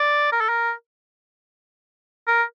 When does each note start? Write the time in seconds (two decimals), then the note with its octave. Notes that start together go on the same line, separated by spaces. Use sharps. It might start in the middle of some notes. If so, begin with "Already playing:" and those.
Already playing: D5
0.32 A#4
0.41 A4
0.49 A#4
2.27 A#4